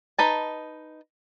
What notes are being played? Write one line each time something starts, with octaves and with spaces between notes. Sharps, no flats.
D#4 B4 A5